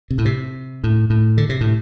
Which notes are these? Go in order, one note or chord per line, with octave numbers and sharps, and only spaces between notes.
C3
A2
C3
A2
A2
D3
C3
A2